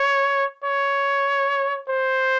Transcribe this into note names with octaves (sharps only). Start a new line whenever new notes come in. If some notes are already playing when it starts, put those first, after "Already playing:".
Already playing: C#5
C#5
C5